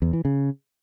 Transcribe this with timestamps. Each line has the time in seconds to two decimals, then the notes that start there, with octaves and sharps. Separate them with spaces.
0.02 E2
0.13 E3
0.25 C#3